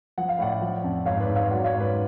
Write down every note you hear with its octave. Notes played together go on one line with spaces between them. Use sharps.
F3 F#5
F5
A2 D5 F#5
F3
F2
G#2 C#5 F5
B4 D5
G#2
C#5 F5
F#3 D5 F#5
C#5 F5
G#2
B4 D5